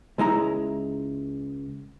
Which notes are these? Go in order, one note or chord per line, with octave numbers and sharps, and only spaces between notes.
C#2 G#3 E4 A#5